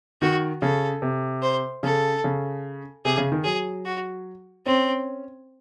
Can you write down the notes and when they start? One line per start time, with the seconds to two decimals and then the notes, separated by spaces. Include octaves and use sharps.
0.22 D#3 F#4
0.62 C#3 A4
1.02 C3
1.42 C5
1.83 C#3 A4
2.24 C#3
3.05 C3 G#4
3.18 C#3
3.32 D#3
3.44 F#3 G#4
3.86 F#4
4.66 C4 C#4